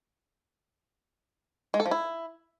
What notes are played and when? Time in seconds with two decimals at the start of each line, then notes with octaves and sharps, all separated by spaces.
1.74 G#3
1.80 A4
1.86 F3
1.91 E4